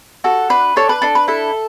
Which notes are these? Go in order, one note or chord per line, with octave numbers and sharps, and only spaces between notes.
F#4 A4
D4 B4
D4 A4 C#5
B4
D4 A4
B4
E4 A4